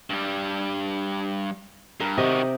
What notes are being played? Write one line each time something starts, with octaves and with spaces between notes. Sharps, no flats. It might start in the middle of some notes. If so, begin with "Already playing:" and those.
G2 G3
G2 A#4
C3 D#3 F#4 G4 D#5